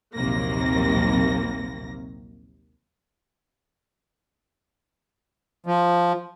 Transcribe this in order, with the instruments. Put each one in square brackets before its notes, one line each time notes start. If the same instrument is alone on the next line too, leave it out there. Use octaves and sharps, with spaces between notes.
[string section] A#1 D#2 C3 F#3 A#3 A#6
[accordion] F3